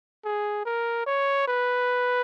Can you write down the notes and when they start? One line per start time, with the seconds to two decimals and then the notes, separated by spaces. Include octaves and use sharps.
0.25 G#4
0.65 A#4
1.07 C#5
1.48 B4